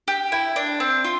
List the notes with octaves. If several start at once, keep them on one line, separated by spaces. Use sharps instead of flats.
G4
E4
D4
C4
F4